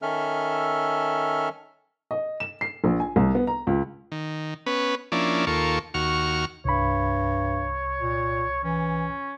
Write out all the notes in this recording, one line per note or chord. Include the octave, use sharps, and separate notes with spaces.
D#3 C#4 A4 E5 F6
D#5
E7
C7
A#1
G#5
C2
B3
A#5
C#2
D#3
B3 C#4 B4
F3 A#3 C#4 D4 E4 D5
D#2 A#3 F4 A4 C#6
D#2 F#4 C#6 F6
C2 G2 C#5 B5
A#2
E3 C#4